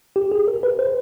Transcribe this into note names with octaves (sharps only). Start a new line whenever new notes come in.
G4
G#4
A#4
B4
C5